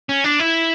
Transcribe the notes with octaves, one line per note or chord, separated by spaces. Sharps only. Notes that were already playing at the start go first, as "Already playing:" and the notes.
C#4
D4
E4